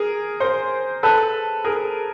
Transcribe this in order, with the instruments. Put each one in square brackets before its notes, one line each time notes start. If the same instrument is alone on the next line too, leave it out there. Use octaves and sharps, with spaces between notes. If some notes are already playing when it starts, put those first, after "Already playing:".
Already playing: [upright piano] G#4 A#4
A#4 C5
A4 B4
G#4 A#4